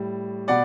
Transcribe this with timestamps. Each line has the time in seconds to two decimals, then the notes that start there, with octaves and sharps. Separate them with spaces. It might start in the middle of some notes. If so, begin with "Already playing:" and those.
Already playing: A2 G3
0.48 B2 D5 F#5